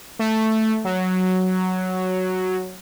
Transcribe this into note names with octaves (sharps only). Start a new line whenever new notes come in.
A3
F#3